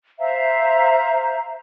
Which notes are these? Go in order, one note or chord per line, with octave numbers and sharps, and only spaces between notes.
C5 E5 F5 A#5